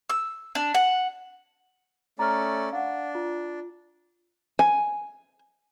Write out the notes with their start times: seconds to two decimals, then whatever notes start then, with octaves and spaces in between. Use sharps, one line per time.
0.10 E6
0.55 D4
0.74 F#5
2.19 A3 C#4 D5 A#5 F6
2.73 D4 F5 F#5
3.15 F4
4.59 G#5